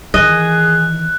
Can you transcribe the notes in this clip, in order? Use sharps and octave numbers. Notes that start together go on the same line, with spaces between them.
D#3 E3 G#4 D#5 F#6